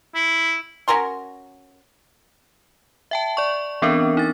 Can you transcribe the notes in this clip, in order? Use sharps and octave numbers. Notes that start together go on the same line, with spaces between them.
E4
C#4 F#4 A#4 C6
E5 G5 A5
D5 C#6
E3 B3 C4 D4 A#4
D#4 A6